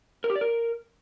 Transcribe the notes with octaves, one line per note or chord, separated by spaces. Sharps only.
A#4
G4
D5
A#4